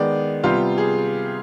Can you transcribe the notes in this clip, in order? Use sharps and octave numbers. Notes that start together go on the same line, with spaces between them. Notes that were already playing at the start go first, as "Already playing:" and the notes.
Already playing: D#3 G#3 B3 D5
C3 G3 B3 F4
G#4